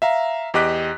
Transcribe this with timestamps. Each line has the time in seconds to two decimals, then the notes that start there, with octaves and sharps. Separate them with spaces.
0.02 E5 F5 A#5
0.54 E2 G4 D#5 D6 F#6 B6